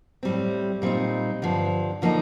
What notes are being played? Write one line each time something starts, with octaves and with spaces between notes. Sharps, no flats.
A2 G3 C4
A#2 G3 C4 D#4
G2 D3 F3
D3 F3 A#3 D#4